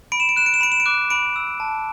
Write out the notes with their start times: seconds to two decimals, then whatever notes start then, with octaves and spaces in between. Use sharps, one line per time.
0.12 B5 D7
0.20 E7
0.29 D7
0.36 F#6 E7
0.46 D7
0.54 E7
0.61 B5 D7
0.72 E7
0.80 D7
0.86 D6 F#6
1.10 B5 D7
1.36 E6
1.60 A5